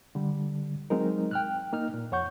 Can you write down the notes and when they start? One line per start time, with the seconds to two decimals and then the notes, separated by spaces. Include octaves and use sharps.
0.15 D3 G3
0.90 F#3 G#3 C4 D#4 A#4
1.31 G5 F6 F#6
1.73 A#3 D#4 F6
1.94 A#2
2.12 F2 C#5 F#5 C#6 G6